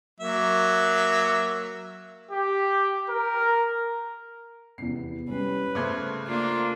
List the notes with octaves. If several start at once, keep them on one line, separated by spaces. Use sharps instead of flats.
F#3 A#3 E5
G4
A#4
E2 C3 B3 C7
G3 C#4 B4
C#3 A3 C5 D6 F#6 G#6
A#3 D4 F4